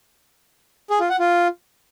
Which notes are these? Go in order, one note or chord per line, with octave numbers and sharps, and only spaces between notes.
G#4
F4
F#5
F4